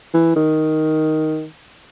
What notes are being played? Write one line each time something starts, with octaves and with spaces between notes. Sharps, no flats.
E3
D#3